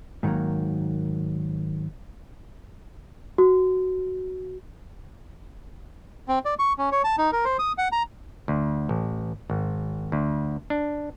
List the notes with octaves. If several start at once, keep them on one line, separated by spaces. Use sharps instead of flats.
G#2 D#3 F3 F#3 A#3
F#4
C4
D5
C#6
C#4
C#5
A5
D#4
A#4
C5
D#6
F#5
A#5
D2
A1
G#1
D2
D4